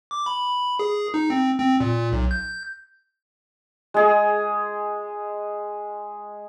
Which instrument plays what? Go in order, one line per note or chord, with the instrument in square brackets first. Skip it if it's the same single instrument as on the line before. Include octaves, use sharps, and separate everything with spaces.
[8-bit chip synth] D6
B5
G#4
D#4
C4
C4
A#2
B1
G6
[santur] G#3 G#4